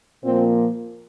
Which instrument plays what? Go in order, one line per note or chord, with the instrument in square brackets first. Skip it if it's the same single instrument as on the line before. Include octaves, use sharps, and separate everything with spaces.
[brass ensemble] A#2 F3 A#3 C4